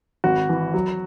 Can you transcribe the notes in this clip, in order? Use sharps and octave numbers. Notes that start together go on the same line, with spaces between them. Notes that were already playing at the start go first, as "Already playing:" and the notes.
G#1 F#4
E3
F#3